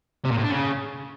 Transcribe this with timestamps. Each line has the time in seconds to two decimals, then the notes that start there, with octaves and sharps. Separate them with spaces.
0.25 C3
0.31 A#2
0.38 A2
0.44 D4
0.50 C#3